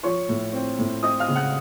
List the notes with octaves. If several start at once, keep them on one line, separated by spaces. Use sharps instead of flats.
F3 C#5 C#6
A2
C4
A2
C4 D#5 D#6
F5 F6
C#3
F#5 F#6